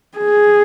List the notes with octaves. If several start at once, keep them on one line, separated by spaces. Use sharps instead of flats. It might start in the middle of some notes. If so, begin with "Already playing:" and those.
G#4